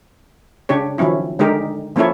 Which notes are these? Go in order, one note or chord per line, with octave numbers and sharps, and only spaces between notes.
C#3 D4 G4 C#5
D#3 F3 F#3 C#4 E4
D3 G#3 D#4 G4 A#4
F3 A#3 C#4 E4 A4 C#5